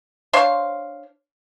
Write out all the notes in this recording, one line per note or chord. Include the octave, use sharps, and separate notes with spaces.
D4 C5 C#5 F5